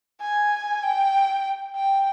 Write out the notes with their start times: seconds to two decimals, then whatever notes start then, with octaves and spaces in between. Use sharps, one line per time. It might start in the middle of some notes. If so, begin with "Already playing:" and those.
0.21 G#5
0.83 G5
1.76 G5